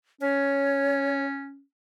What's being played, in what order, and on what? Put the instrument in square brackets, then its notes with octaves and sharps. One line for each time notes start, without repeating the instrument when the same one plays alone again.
[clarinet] C#4 [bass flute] C#5